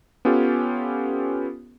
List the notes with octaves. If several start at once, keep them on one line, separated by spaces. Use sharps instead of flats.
B3 C#4 F4 G4 A4